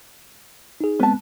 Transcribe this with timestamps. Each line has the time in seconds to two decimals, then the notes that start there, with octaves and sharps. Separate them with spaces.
0.81 D#4 G#4
0.99 G#3 B3 C4 B4 A5